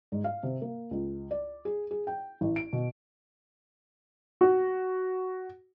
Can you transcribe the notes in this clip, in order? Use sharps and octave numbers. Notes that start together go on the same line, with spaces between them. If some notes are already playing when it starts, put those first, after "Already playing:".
G#2
F5
C3
A#3
C#2
D5
G#4
G#4
G5
A1
D7
B2
F#4